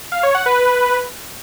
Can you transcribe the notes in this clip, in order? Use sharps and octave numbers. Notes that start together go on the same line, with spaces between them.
F5
C#5
F#5
B4